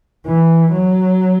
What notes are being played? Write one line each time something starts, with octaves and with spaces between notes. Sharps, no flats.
E3
F#3